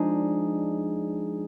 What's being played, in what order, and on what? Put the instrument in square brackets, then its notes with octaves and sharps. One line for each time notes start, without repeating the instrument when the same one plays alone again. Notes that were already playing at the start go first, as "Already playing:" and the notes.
Already playing: [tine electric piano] F3 G#3 D#4 G#4 [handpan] D4